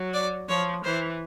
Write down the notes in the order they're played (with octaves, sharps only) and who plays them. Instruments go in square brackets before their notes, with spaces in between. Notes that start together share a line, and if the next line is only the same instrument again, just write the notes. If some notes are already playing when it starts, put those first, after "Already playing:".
Already playing: [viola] F#3
[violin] D5
[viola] F3 [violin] C#5
[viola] E3 [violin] C5